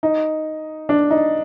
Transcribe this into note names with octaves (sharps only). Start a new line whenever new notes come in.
D#4
D4
D#4